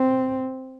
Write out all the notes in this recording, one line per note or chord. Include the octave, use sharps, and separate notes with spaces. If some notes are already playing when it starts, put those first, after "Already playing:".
Already playing: C4